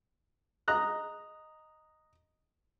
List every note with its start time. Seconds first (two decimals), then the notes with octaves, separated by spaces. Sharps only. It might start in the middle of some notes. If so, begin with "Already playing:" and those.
0.68 D#5 A#5 F#6